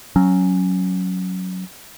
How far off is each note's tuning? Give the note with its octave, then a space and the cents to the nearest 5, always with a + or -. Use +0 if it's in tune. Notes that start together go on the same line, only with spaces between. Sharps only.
F#3 +0 C#4 +0